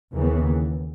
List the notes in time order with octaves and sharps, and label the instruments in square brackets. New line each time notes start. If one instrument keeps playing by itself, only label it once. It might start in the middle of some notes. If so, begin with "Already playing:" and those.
[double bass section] D#2 C#3 E3 B3